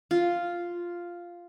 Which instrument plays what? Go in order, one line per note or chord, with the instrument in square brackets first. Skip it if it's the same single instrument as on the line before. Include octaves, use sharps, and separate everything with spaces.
[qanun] F4